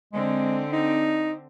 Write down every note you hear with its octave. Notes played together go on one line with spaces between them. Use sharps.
D3 G#3 C4
D#4